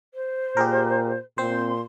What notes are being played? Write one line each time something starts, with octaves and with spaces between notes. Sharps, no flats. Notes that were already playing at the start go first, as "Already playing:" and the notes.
C5
A#2 G4 G#4 A#4
A#2 C4 C5 C6